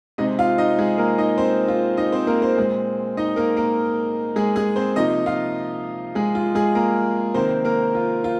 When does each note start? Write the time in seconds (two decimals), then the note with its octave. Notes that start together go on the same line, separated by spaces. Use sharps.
0.18 C3 G#3 C4 D#4 D#5
0.39 F4 F5
0.58 D#4 D#5
0.79 G#3 G#4
0.98 A#3 A#4
1.18 D#4 D#5
1.38 C4 C5
1.68 F4
1.97 D#4 D#5
2.12 C4 C5
2.27 A#3 A#4
2.42 C4 C5
2.57 A#2 G#3 C4
3.17 D#4 D#5
3.36 A#3 A#4
3.57 A#3 A#4
4.36 G#3 G#4
4.56 G#3 G#4
4.76 C4 C5
4.96 C3 F3 A#3 D#4 D#5
5.26 F4 F5
6.15 G#3 G#4
6.35 F4
6.55 G#3 G#4
6.75 A#3 A#4
7.34 C3 D#3 A#3 C4 C5
7.65 A#3 A#4
7.95 F4
8.24 F4